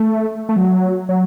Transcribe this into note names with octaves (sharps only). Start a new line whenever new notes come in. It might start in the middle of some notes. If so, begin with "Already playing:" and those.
Already playing: A3
A3
F#3
F#3